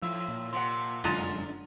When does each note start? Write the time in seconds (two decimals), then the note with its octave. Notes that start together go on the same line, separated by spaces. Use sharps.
0.02 A2 F3 E4 F4 E6
0.28 A#2
0.53 C3 F3 F#5 C6
1.04 F1 F#2 D3 G#3 D4 F4 A#5